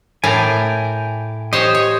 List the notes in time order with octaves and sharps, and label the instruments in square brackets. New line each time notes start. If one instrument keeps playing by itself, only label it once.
[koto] A2 A#4 D5 [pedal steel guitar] G5 G#5
[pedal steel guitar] G4 D#5 [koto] C5 C#5
[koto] C#5